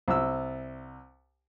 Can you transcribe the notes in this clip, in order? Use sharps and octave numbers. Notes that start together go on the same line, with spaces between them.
C2 E6